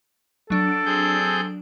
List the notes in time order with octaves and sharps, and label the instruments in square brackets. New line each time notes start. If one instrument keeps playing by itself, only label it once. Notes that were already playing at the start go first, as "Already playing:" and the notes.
[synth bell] F#3 D4 D7 [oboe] A4
[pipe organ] C4 G#4 G6